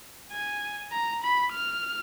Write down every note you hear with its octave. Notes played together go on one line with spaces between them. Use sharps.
G#5
A#5
B5
F6